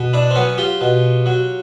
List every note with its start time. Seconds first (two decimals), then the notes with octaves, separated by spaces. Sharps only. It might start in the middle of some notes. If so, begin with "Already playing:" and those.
Already playing: B2
0.13 D4 E4
0.30 C4
0.35 F#3 B3 C#4
0.58 F4 G4
0.81 B2
1.26 F#3